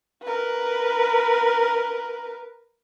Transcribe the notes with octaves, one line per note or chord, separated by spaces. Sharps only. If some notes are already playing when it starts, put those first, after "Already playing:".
A#4 B4